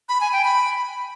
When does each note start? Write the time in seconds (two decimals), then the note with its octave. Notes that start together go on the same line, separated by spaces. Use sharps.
0.09 B5
0.21 G#5
0.33 G5
0.45 B5